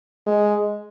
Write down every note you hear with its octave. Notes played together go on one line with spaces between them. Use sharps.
G#3